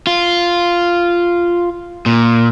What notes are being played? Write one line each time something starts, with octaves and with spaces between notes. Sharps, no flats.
F4
A#2